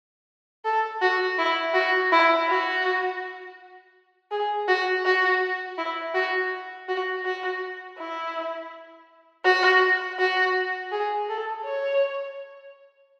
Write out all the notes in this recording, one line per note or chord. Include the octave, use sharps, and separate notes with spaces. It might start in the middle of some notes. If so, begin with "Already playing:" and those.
A4
F#4
E4
F#4
E4
F#4
G#4
F#4
F#4
E4
F#4
F#4
F#4
E4
F#4
F#4
G#4
A4
C#5